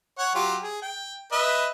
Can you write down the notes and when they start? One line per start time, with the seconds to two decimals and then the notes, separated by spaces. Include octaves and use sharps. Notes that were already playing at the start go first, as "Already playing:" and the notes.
0.19 C#5 F#5
0.35 F#3 F4 G4
0.62 G#4
0.82 G5
1.32 B4 D#5 E5